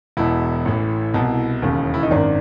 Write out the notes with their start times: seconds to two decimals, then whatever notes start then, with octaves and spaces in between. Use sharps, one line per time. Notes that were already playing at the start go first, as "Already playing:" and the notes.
0.17 E1 E2 B2 E4
0.65 A1 A2 E3
1.14 C2 B2
1.62 E1 D#2 C#3
1.94 E4
2.03 D#4
2.10 G#1 F#2 D#3 D4